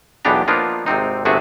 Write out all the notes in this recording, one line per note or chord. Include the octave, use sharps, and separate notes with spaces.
B1 E2 B3 D4 G4 A#5
F3 A#3 B3 D4 D#4 F4
G#1 C3 C4 D#4
G1 C3 A3 F#4 G#4